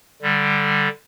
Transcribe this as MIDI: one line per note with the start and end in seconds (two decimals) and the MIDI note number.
0.22 0.88 50
0.22 0.88 55